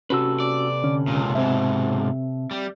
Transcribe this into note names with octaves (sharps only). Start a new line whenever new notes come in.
C3 C#4 F#4 A4 B4 E6
D5
D3 C#4
C#2 A#2
G#2 B2 C4 E5
G3